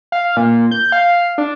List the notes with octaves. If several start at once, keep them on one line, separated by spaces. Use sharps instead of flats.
F5
A#2
G6
F5
D4